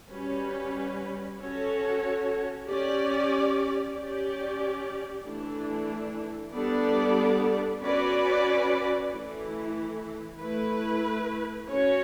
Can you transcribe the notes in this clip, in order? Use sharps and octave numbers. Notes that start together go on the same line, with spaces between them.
G3 C#4 F#4 B4
C#4 F#4 A4 C#5
C#4 G4 D5
C#4 G4 D5
E3 A3 D4
G3 B3 D4 A4 D5
C#4 F#4 B4 D5
E3 A3 E4
A3 E4 B4
C#4 F#4 C#5